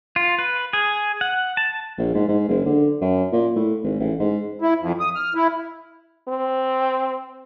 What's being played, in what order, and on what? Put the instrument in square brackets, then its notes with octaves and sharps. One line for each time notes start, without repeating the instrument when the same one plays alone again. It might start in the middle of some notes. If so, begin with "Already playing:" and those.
[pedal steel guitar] F4
B4
G#4
F#5
A5
[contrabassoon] A#1
G#2
G#2
F#1
D3
F#2
A#2
A2
G#1
A1
G#2
[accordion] E4
F2
D#6
F6
E4
[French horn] C4